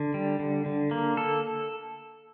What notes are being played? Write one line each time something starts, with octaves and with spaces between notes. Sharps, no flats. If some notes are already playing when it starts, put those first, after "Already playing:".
Already playing: D3
G3
D3
D3
A#3
A4